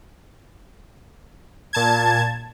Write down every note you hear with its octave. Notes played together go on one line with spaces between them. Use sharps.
A#2 A5 G#6